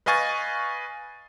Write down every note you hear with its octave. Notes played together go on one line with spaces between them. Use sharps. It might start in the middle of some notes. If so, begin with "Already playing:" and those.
B4 D#5 F5 G#5 C#6 A6